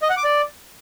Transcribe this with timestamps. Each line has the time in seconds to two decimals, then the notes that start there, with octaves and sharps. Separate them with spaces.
0.02 D#5
0.10 F#5
0.17 D6
0.24 D5